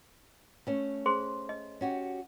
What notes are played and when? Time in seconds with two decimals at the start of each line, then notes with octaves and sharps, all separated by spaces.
0.67 A3 C#4
1.06 G#4 C5 C6
1.49 D#5
1.81 C#4 F#4 G4